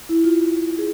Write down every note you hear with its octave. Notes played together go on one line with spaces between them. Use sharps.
E4
F4
G#4